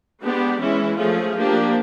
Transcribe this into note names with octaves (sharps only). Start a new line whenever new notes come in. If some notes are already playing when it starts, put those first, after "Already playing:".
G#3 B3 D4 G4
E3 G#3 C#4 E4
F3 A3 C#4 F4 G#4
F3 A#3 D4 G4